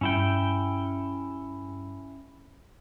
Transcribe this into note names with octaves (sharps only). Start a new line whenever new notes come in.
G2 C#4 E4 G5